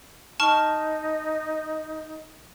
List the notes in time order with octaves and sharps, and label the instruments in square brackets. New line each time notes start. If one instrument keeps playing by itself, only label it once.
[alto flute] D#4 [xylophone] A5 C#6 F6